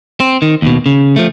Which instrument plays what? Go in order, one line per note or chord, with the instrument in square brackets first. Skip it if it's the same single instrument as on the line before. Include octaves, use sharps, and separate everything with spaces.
[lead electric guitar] C4
D#3
D#2 B2
C#3
F3 A3